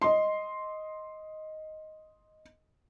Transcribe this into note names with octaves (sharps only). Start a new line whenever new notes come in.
D#5 C6